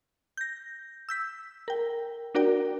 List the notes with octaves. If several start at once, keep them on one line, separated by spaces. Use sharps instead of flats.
G6 A#6
E6 G6 B6
A#4 G5
D4 F#4 A#4 D5 G5